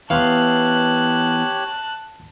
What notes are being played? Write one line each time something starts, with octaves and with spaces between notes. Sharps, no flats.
E3 B3 G4 C#5 F5 A5 C6 F#6